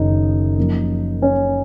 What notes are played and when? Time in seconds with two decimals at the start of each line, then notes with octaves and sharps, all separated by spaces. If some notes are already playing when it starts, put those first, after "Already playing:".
Already playing: F#1 F#2 D#3 D#4
0.57 F#2 F3 A#3
1.22 C#4 C#5